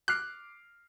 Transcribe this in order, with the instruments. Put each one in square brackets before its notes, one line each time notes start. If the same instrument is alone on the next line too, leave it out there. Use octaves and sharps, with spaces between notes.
[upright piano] D6 F6 C7 [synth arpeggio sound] F#6